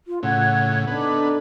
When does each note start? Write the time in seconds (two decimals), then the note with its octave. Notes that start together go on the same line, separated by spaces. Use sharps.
0.08 F4
0.23 A2 C#3 F#5 F#6 G#6
0.87 B3 D4 D#4 A4